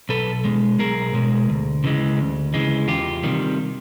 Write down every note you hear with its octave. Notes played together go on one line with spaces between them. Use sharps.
B1 A4 B4
B2 G#3
B1 G#4 A#4
B2 G#3
D2
C#3 E3 G#3
D2
C#3 E3 G#3
E2 F4 G4
C3 D#3 G3